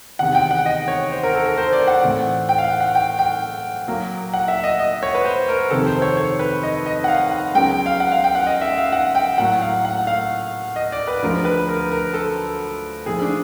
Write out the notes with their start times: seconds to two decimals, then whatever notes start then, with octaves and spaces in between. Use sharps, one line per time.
0.19 E2 C3 D#3 F#5
0.35 G5
0.51 F#5
0.66 D#5
0.88 C#5
1.12 C5
1.23 A#4
1.35 A4
1.46 A#4
1.58 C5
1.73 D5
1.87 F#5
2.04 A2 E3 A3 C4
2.49 G5
2.58 F5
2.64 F#5
2.80 F#5
2.95 G5
3.19 G5
3.87 A#2 F#3 A#3
4.33 F#5
4.48 E5
4.64 D#5
4.79 D#5
5.03 C#5
5.15 B4
5.24 C5
5.49 A#4
5.70 F2 C3 D#3 A4
5.87 C5
6.02 C#5
6.17 C#5
6.39 B4
6.63 D#5
6.86 D#5
7.04 F#5
7.08 F5
7.31 F#5
7.54 C#2 C#3 F#3 B3 G5
7.86 F5
8.00 F#5
8.12 F5
8.24 G5
8.35 F#5
8.46 D#5
8.61 E5
8.78 F5
8.92 F#5
9.15 G5
9.38 A2 F#3 A#3 F#5
9.62 F5
9.85 F#5
10.07 F5
10.76 D#5
10.92 D5
11.08 B4
11.22 D2 D3 F3 G#3 A#4
11.45 B4
11.69 A#4
11.92 A#4
12.14 A4
13.06 A#2 F3 A3 G#4
13.22 D4